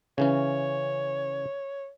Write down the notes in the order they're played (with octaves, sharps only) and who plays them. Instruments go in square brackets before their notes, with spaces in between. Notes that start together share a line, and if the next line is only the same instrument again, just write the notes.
[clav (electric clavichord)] C#3 E3 C#4 [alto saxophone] C#5